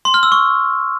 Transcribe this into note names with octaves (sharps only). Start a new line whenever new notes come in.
C6
F6
E6
C#6